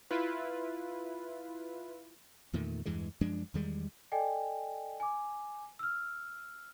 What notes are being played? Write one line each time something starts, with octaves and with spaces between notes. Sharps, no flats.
E4 F4 B4
E2 A#2 D#3 A3
E2 G2 E3 G#3
F#2 F3 G#3 D4
E2 D#3 G3 G#3
A4 D5 D#5 G5 G#5
G#5 D6
E6 F6